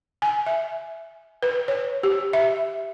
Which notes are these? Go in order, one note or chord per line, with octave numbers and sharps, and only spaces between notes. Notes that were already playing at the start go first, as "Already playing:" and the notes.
G#5
E5
B4
C#5
G4
E5